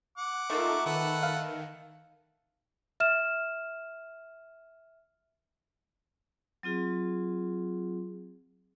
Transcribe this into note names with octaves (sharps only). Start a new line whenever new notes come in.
F#5 D6
A3 A#3 D#4 F4 A4
D#3 A4 B4 F#5
F5
E5 F6 E7
F#3 C4 F4 G#4